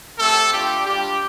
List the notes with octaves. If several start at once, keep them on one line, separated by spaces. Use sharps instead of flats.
A3 C4 G4 A4
A3 D4 F4 G4
G3 D4 F4 G4